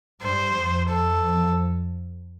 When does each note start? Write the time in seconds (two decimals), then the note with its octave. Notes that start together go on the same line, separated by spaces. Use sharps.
0.22 G2 G3 C5
0.56 F2 F3
0.89 F2 F3 A4
1.22 F2 F3